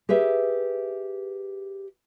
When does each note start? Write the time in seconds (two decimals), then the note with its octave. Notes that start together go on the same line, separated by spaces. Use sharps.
0.09 G4 G#4 B4 E5